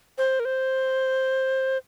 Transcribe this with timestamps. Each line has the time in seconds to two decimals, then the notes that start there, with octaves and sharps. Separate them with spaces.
0.18 C5
0.40 A#4
0.45 C5